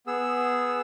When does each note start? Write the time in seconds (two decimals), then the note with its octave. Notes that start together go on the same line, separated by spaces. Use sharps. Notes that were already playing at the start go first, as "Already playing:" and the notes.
0.07 B3 G#4 E6